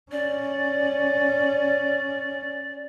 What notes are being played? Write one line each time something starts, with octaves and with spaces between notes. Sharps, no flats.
C#4 D5